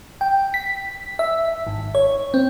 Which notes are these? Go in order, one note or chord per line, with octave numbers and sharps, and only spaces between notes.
G5
B6
E5
G#1
C#5
C4